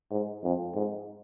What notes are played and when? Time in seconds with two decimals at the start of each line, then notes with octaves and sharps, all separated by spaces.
0.11 G#2
0.43 F2
0.75 G#2